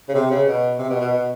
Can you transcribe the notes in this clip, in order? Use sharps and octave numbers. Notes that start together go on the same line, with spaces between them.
C#3
C3
C#3
B2
C3
B2
B2
B2